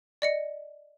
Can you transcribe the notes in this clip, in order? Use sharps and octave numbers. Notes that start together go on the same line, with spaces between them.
D5 D#5 C#7